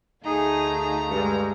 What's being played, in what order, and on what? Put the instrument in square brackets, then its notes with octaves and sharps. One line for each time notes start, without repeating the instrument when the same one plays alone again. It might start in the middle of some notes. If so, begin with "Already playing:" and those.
[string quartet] D2 A3 F5 [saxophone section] D#4 [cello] G#4 [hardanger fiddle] A#5
[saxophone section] G2 [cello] G#3